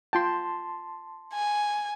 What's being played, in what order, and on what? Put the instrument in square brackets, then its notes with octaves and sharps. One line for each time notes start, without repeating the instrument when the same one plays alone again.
[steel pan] F4 G5 [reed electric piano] A5 C6
[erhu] G#5